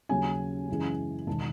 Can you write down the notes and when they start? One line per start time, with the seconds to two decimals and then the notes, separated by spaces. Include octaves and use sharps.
0.09 D#2 C#3 F#3 C#4 G#5
0.68 F#2 C#3 E3 G#3
1.27 E1 D#3 A5